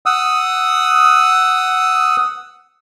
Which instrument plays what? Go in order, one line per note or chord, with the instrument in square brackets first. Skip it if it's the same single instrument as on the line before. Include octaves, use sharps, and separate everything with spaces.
[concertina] F#5 D#6 E6